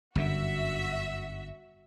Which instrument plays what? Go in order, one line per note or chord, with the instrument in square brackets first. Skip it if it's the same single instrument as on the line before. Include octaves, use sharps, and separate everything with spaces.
[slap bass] G1 F#2 D3 [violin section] F#4 E5